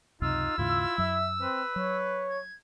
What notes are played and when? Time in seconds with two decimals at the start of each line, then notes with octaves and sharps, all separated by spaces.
0.22 C#2 F#2 C3 D#4 F4 E6
0.58 D#2 G#2 C#3 E4 F4
0.98 F#2 F#3 E5
1.41 C4 B4
1.76 F#3 C#5
2.29 G#6